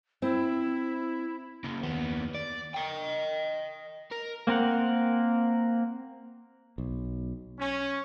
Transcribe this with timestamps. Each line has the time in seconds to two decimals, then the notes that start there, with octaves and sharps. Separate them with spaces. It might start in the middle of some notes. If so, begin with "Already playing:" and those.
0.22 C4 E4
1.64 C#3 A#3
1.83 D#2 B3
2.35 D5
2.75 D#5 G5
4.12 A#4
4.47 A#3 C4 A#4 F#5
6.78 B1
7.59 C#4